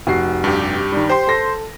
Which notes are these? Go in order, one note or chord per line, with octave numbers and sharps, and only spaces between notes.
F1 F#4 C7
G2 G4
D#3 G3
G4 C5 C6
A4 A#6